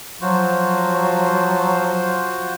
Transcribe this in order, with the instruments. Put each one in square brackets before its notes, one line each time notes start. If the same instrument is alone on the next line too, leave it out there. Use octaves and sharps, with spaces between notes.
[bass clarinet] F3 [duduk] F#3 [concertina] F4 F#4 C5